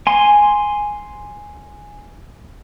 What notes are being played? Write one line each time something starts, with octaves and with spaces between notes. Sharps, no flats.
G#5 C6